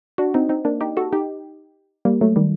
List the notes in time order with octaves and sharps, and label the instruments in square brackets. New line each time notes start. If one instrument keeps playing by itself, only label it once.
[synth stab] D4 F#4
C4 D#4
C4 D#4
A#3 D4
D#4 G4
F#4 A4
D#4 G4
G3 A#3
F#3 A3
D#3 G3